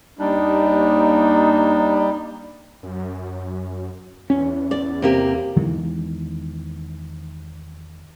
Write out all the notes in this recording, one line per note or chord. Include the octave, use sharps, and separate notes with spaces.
D#2 G3 A#3 D4 D#4
F#2
E2 C#4
D5
C3 A#3 G4
E2 D#3 E3 G#3